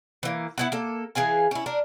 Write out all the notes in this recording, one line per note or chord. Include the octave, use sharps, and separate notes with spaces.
E3 A#3
B3 E4 F#5
A#3 A4
E3 G#4 F5 G#5
C#4 E4
D4 A#4